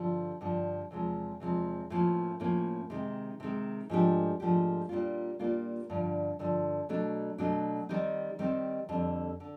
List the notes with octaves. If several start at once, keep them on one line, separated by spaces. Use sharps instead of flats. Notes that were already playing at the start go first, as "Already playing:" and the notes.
Already playing: G2 D3 F3
G2 D3 F3
E2 C3 F3 G#3
E2 C3 F3 G#3
A2 F3 A#3 C#4
A2 F3 A#3 C#4
C3 D#3 G#3
C3 D#3 G#3
G#2 F3 A3 D4 G4
G#2 F3 A3 D4 G4
A#2 G3 A#3 D4 F4
A#2 G3 A#3 D4 F4
G2 D3 F3
G2 D3 F3
B2 F#3 A3 D4
B2 F#3 A3 D4
D#3 G3 C4 D#4
D#3 G3 C4 D#4
F2 D3 G3
D3